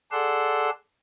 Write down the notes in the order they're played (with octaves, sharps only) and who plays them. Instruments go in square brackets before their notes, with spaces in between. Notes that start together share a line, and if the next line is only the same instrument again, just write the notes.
[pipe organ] G#4 A4 D5 F#5 C6 E6